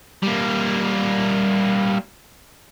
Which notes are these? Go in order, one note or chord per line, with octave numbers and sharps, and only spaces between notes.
G3 A#3